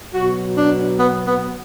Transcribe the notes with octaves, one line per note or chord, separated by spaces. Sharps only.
B2 F#3 F#4
D4
B3
B3